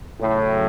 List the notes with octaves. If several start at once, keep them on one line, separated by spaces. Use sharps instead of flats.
E2 A2 C#3 F#3